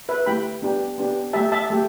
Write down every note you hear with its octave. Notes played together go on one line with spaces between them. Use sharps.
B4 E5
A3 E4 G4 G5 B5
B3 D4 G4
B3 D4 G4
A3 G4 E5 A5
E5 A5
A3 G4